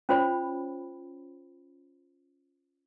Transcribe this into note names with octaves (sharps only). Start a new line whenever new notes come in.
C#4 F4 C5 C#5 B5